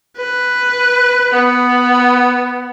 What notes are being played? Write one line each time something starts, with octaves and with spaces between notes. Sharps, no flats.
B4
B3